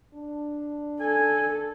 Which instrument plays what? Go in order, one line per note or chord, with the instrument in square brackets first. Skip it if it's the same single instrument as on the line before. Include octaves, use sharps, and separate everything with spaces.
[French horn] D4
[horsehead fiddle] A4 [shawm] G#5